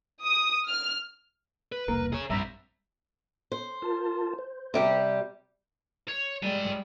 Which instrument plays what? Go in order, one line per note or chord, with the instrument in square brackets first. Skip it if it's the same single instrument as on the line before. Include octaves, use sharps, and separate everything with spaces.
[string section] D#6
F6
[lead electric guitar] B4
[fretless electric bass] E1 C2 A#3 [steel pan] A#4
[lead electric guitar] G#4 C#5
[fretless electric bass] A#1 G2 [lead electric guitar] G3 C4 [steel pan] E5 A#5 B5
[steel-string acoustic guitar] C5
[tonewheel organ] F4 A#4 A5
C5
[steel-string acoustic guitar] C3 G3 G4
[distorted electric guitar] C#5
[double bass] G3 G#3 [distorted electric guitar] D5 G#5